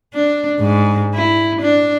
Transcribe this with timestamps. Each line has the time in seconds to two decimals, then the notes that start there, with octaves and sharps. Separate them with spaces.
0.14 D4
0.60 G#2
1.14 E4
1.61 D4